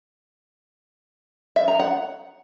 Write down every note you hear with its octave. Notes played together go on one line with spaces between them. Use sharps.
E5
A#5
F#5